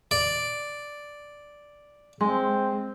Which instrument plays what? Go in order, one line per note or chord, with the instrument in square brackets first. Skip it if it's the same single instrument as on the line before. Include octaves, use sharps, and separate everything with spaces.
[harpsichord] D5
[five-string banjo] G#3 [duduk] C4